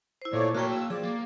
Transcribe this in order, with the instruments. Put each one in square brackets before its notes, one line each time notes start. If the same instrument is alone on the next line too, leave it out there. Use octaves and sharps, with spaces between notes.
[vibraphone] E4 C5
[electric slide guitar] A#2 [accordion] A3 C#5 D5
[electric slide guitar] A#3 A5 [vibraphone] F#4 G5 [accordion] A#4 C#5
[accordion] E6
[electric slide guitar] F3 [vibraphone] G#4 [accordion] D5
[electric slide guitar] A#3